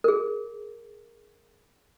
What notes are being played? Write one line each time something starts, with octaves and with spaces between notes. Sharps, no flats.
G#4 A#4